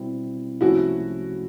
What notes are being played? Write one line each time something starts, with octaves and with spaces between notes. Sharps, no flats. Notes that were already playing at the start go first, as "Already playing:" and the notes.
Already playing: B2 G3 C4 E4
C2 C3 F3 A3 C#4 E4 F#4